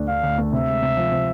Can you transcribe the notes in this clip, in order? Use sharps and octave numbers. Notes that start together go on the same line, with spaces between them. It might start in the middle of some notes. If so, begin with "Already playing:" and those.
Already playing: D2 A3 D4
D3 F5
D2
A3
C3 E5
G#3
C3
F3
C3